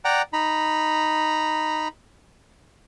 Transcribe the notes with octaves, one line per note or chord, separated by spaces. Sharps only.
D5 F#5 G5 A#5
D#4 A#5 B5